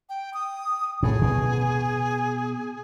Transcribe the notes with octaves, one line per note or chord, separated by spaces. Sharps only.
G5
D#6
A2 G#4
B2